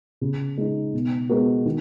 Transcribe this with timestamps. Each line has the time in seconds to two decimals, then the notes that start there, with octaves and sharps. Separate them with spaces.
0.21 C#3
0.58 G#3 D#4
0.93 B2
1.29 G#3 B3 F#4 A#4
1.66 D#3